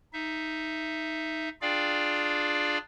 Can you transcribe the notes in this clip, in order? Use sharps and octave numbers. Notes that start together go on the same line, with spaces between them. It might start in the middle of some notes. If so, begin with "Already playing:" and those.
D#4 E5
D4 F4 G#4 D5 F5 G5